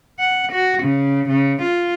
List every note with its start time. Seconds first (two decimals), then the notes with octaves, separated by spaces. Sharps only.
0.19 F#5
0.52 F#4
0.83 C#3
1.29 C#3
1.62 F4